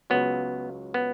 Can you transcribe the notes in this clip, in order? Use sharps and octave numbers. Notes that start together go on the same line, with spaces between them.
C#2 C#3 F#3 B3
B3